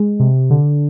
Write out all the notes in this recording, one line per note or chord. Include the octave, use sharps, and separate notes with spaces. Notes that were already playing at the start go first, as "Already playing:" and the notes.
Already playing: G#3
C3
D3